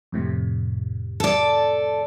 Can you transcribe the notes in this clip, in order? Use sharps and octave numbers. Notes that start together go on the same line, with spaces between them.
F2 A2 C3
A4 D5